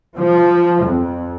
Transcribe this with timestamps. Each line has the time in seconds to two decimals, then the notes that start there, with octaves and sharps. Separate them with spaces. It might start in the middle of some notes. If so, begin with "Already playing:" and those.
0.17 F3
0.84 F2